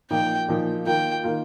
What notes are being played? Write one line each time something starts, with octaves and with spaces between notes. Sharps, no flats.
A#2 F3 A#3 D#4 G5
A#2 F3 A#3 D#4
D#3 A#3 F4 G5
D#3 A#3 F4